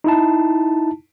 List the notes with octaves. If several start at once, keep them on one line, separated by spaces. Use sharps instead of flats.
D#4 E4 A5